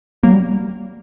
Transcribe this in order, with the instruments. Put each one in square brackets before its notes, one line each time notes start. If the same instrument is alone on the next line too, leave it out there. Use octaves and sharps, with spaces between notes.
[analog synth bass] F#3 [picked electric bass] A#3
[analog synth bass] G3